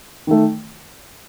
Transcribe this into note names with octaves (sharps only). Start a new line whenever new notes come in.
D#3 A3